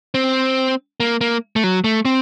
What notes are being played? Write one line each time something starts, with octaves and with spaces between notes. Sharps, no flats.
C4
A#3
A#3
A3
F#3
A3
C4